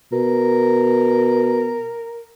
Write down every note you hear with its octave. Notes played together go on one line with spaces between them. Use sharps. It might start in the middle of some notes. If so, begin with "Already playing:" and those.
B2 A#4